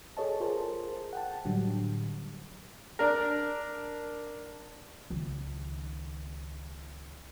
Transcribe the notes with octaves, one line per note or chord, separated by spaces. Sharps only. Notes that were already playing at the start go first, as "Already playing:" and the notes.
G#4 A4 C#5 D#5 A5
F4 G#4 A#4 C5 A5
F#5 G5 A5
A2 D3 F#3 G3
D4 A#4
C#2 D#3